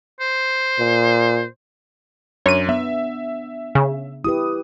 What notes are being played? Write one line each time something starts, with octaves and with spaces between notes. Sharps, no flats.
C5
A#2
F#2 D4 C#5 D#7
B3 E5
C#3
E4 G4 B4 D#6